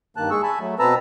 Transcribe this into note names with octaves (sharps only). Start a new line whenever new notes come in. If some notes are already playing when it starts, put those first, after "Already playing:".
G2 D#3 A#3 A5 F#6
G#3 G#4 C#6 E6
G#5 A5 B5
F#3 A3
B2 C4 B4 A5 A#5 E6